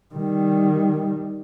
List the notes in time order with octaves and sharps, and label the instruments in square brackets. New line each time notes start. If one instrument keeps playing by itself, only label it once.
[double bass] D#3 G3